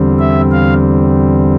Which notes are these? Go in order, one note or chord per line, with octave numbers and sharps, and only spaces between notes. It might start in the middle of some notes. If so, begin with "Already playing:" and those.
Already playing: E2 D3 G3 C4
E5
F5